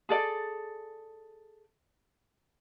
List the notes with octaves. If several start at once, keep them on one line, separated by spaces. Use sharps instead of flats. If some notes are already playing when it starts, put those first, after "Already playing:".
G#4 A4 D5